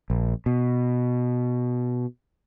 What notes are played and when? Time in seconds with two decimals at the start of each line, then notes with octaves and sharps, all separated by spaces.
0.10 A#1
0.46 B2